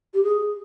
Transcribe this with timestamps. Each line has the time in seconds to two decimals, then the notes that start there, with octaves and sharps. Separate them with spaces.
0.14 G4
0.23 G#4